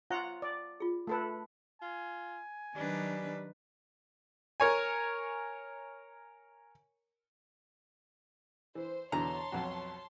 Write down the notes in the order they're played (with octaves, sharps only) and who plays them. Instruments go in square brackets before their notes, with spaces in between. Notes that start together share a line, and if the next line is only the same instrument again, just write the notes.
[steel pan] F4 F#5 A#5 [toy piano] C#5 C#6
[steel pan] D5
[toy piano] F4 G#4
[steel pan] A3 A4 B4
[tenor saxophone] F4 [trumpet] G#5
[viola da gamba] D#3 B4 [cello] F#3 D4 [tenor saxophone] G3
[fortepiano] A#4 C#5 G#5
[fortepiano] E3 [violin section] C5
[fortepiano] E2 B2 D3 [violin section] C#5 A5 C6 [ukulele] A#5
[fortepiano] B1 F2 F#4